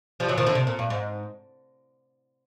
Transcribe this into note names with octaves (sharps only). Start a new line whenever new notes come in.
F3 G3
E3 F#3
D#3 F3
D3 E3
C3
A#2
G2
G#2